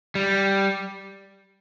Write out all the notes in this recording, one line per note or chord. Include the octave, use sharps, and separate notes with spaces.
G3